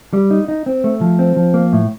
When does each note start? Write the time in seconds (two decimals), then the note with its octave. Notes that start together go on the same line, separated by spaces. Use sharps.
0.13 G3
0.31 D#4
0.48 D#4
0.66 C4
0.84 A3
1.01 F3
1.19 C4
1.36 F3
1.54 A#3
1.73 A2